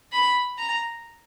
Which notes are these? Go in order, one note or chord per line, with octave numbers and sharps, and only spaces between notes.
B5
A#5